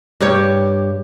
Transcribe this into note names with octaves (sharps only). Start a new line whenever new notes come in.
G2 G4 C#5